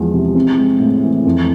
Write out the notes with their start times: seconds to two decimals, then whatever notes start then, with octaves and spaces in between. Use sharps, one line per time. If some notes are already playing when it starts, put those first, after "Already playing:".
Already playing: E2 F3 G#3
0.13 C3
0.35 C4
0.58 G#3
0.80 A2
1.03 E3
1.26 F2